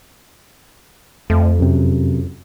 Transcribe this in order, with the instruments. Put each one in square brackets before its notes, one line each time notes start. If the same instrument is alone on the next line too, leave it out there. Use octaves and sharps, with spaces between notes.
[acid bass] F2 [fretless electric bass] A3
[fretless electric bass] F#2 C3